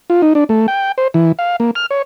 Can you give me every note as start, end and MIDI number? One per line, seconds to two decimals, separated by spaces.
0.10 0.22 65
0.22 0.33 63
0.35 0.44 62
0.49 0.67 57
0.68 0.92 79
0.98 1.08 72
1.14 1.32 52
1.39 1.56 77
1.60 1.71 58
1.75 1.86 89
1.91 2.02 73